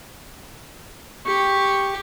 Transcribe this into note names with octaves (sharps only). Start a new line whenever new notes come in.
G4 C#6